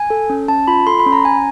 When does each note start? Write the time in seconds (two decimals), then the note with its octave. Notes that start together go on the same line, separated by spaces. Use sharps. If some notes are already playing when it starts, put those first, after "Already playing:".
Already playing: G#5
0.10 A4
0.30 C#4
0.48 C#4 A5
0.68 F4 B5
0.87 A4 C6
0.99 B5
1.06 C#4
1.12 A#5
1.25 C#4 G#5